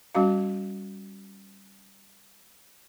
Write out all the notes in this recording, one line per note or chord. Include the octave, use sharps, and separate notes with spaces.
G3 C#4 F#4 F5